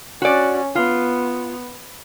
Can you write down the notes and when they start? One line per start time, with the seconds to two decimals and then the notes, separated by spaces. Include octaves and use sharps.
0.22 C#4 F#4 D5
0.75 B3 F4